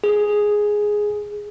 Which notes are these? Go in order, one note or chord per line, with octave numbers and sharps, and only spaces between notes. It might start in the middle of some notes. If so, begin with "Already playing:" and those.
G#4